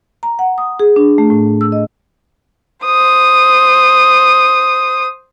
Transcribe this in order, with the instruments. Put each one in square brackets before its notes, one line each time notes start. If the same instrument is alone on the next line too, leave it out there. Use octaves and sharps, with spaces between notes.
[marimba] A#5
F#5
D#6
G#4
D4
A3
A2
E6
D#5
[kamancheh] C5 D#6